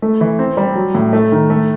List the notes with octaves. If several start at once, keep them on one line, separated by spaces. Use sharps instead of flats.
A3
E3
C4
G3
F#3
A2
A3
D#3
A3